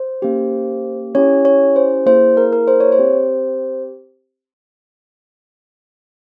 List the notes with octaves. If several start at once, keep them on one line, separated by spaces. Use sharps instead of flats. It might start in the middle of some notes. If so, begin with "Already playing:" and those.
Already playing: C5
A#3 C#4 G4
C#4 E4 G4 C#5
C#5
C5
A#3 E4 G#4 C5
A#4
A#4
C5
C#5
C5
C4 G4